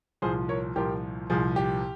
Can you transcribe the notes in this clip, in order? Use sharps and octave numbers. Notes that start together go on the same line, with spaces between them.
C2 A#2 F3 G#4 C5
A#4 C#5
C2 A#2 F3 G4 A#4
C2 A#2 F3 G#4
G4